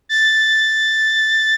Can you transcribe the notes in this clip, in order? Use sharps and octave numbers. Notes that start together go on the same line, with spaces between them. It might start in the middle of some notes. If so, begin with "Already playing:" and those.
A6